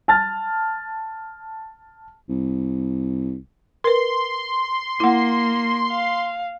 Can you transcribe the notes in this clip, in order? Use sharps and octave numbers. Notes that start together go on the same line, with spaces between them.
A5 F6 A6
C2
A#4 B4 C6
A#3 E4 F#5
F5